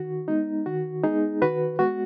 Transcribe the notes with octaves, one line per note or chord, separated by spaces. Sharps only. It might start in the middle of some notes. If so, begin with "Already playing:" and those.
Already playing: D#3 F#4
G#3 B3 D#4
D#3 F#4
G#3 B3 D#4 G#4
D#3 F#4 B4
G#3 B3 F#4